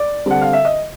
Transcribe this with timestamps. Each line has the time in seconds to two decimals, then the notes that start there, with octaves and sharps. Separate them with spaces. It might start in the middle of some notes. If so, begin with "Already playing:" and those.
Already playing: D5
0.26 D3 G3 C4 F#5
0.41 F5
0.53 E5
0.65 D#5